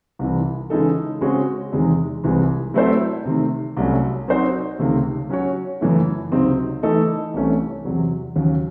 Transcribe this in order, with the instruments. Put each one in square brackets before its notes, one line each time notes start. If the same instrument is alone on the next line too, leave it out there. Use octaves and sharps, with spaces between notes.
[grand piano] C2 C3 E3
C#3 E3 G#3 D#4 A4
C#3 G#3 C4 F#4 C#5
E2 C3 D#3 G#3
C2 C3 E3 G#3
F#3 A3 C4 E4 C5
C3 D#3 A3
C2 C3 F#3 A3 C#4
F#3 C4 D#4 F#4 C5
C#2 C3 D#3 A3
F#3 C#4 F#4 C#5
F#2 C#3 E3 A3
C#2 C3 F#3 C4 D#4
E3 A3 D#4 A4 D#5
C2 C3 E3 A3 C#4
E2 C3 F#3
D#2 C#3 F#3